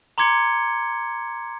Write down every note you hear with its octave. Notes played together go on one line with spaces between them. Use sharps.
A#5 C6 D6 G#6 C#7 G7